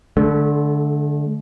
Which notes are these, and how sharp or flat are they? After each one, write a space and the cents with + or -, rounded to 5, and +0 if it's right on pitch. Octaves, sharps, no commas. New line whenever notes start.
D3 +0 A3 -35